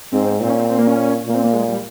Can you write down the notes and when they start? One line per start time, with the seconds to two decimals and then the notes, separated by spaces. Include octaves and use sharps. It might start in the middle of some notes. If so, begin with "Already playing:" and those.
0.12 G#2 C4
0.40 A#2 C4
0.50 C#4
0.59 C4
0.69 C4
0.79 A#3
0.87 C#4
1.26 A#2 A#3
1.35 C4
1.44 A#3
1.54 G#3
1.68 G3